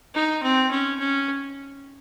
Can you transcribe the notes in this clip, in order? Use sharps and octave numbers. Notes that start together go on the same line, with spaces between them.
D#4
C4
C#4
C#4